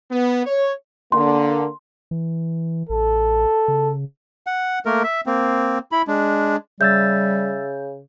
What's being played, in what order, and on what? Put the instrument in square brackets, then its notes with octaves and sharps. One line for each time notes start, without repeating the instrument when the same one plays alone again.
[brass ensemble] B3
C#5
[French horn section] D3 A#3 [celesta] C6
[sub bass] E3
[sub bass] A1 [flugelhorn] A4
[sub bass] C#3
[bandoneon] F#5
A3 A#3 A#4
E5
A#3 C4
E4 B5
G#3 D4
[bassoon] C#3 [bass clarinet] G3 [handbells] E5 E6 A6 [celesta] G6